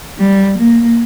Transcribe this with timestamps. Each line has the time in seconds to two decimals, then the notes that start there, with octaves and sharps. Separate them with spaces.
0.19 G3
0.58 A#3